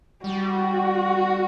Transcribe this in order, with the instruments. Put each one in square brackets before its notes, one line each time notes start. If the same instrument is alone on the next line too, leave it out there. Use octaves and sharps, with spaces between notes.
[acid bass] G3 [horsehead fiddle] F#4